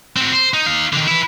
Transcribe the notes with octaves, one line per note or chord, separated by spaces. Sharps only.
C4 F#4
C5
D#4
D#4 F5
D3 D#3
E4 B4